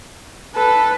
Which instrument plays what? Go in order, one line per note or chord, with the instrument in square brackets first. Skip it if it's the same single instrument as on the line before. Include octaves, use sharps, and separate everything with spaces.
[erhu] A4 [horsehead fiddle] B4